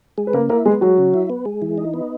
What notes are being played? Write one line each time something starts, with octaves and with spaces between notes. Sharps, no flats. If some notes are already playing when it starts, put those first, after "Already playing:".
G#3
B4
C#3 A#3 A#4
A#3 E4 A#4
G#3 B3 G#4
F#3 G#3 F#4
C#3
E4
B3
G#3
E3
D#4
B3